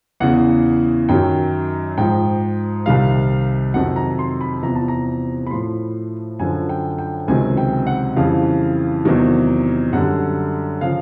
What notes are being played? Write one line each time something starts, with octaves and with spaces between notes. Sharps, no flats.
E2 C#3 E3 F#5
F#2 D#3 F#3 G5
G#2 F3 G5
C2 C3 D#3 G3 F5
F2 C3 D#3 F#3 F#5
A#5
C6
B5
E2 C3 F3 A#5
A5
A#5
B5
A2 F3 C6
F#2 D3 F3 G#5
G5
G5
C#2 C3 D#3 F#3 G#5
G5
F#5
F2 C#3 E3 G3 F5
E2 C3 D#3 F#3
F#2 D3 G3 F#5
C#3 F3 F5